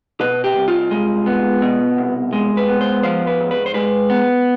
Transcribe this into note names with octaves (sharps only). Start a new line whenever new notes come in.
B2 B4
G4
C2
F4
G#3
B3
B2
C2
G#3
B4
B3
C5
F3 C5
B4
G#2
B4
C5
G#3 B4
B3